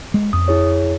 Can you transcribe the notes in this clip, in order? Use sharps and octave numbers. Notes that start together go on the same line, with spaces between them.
G#3
F2 D#6
E4 G#4 C#5